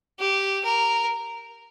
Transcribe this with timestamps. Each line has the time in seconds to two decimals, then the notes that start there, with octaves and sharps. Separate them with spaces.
0.20 G4
0.64 A#4